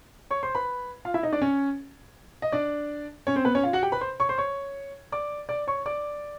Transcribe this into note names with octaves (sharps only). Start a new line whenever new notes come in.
C#5 C#6
C5 C6
B4 B5
F4 F5
E4 E5
D#4 D#5
D4 D5
C#4 C#5
D#5
D4 D5
C#4 C#5
C4 C5
B3 B4
C#4 C#5
F4 F5
F#4 F#5
G4 G5
B4 B5
C5 C6
C#5 C#6
C5 C6
C#5 C#6
D5 D6
D5 D6
C#5 C#6
D5 D6